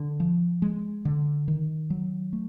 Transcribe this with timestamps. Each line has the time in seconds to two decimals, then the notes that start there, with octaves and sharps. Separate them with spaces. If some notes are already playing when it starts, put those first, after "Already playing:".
Already playing: D3
0.20 F3
0.62 G#3
1.05 D3
1.48 D#3
1.90 F#3
2.33 A3